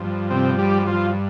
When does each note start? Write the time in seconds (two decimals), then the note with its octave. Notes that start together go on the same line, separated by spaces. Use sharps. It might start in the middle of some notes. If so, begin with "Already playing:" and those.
Already playing: G2 F3
0.30 C3 C4
0.58 G3 G4
0.87 F3 F4